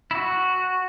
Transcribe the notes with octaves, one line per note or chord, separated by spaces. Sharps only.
E4
F#4